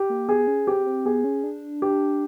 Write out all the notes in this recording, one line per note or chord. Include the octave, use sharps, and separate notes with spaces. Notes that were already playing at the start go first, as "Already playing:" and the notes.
Already playing: G4
A#3
B3 G#4
C#4
C4 G4
C4
B3 G#4
C#4
D4
G4